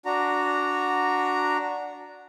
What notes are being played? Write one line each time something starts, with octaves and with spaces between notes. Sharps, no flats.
D4 F#4 A#5